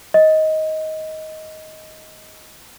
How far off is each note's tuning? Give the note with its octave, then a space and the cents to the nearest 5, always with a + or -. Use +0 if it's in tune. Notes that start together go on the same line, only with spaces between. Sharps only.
D#5 +15